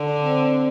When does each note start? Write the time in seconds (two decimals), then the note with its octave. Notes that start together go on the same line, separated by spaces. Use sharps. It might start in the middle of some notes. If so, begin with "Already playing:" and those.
Already playing: D3
0.22 C4